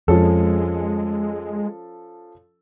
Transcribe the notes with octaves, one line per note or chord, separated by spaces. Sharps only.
F2 F3 G#3 C#4 A4